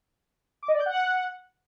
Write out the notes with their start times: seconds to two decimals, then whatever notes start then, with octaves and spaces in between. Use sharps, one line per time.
0.63 D6
0.68 D#5
0.74 D5
0.80 G6
0.86 F#5